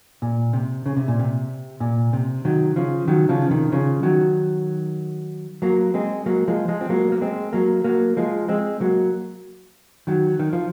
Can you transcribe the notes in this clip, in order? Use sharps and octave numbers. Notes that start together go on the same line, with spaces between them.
A#2
C3
C#3
C3
A#2
C3
A#2
C3
D#3 F#3
C#3 F3
D#3 F#3
C#3 F3
C3 D#3
C#3 F3
D#3 F#3
F#3 A#3
G#3 C4
F#3 A#3
F3 G#3
F3 G#3
C4
F#3 A#3
A#3
G#3 C4
F#3 A#3
F#3 A#3
F3 G#3
G#3 C4
F#3 A#3
D#3 F#3
D#3
F3